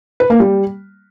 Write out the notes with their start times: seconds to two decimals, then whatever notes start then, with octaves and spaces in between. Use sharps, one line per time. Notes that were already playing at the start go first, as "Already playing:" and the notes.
0.20 B4
0.30 A#3
0.40 G3